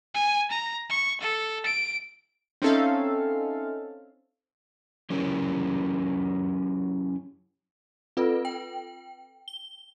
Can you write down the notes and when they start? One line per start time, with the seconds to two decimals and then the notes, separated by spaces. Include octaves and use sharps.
0.15 G#5
0.51 A#5
0.90 C#6
1.21 A4
1.66 D7
2.62 C4 C#4 D#4 A4 E5 F5
5.10 F#3 C#4 E4 G4 A#4
8.17 C4 F4 A4 B4
8.45 G5
9.48 G7